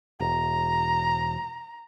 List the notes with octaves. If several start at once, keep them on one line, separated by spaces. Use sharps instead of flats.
E1 A#5